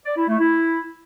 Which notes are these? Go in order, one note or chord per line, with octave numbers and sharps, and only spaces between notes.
D5
E4
A3
E4